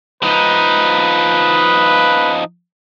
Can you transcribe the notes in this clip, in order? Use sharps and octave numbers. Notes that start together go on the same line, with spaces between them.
F3 D#4 B4